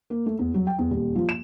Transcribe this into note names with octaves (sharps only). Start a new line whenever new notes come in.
A#3
A3
E2
F#3
G5
E2
D#1
F3
E7